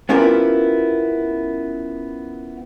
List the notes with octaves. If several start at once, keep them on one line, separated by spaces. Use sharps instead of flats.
B3 C#4 E4 F4 G4 A#4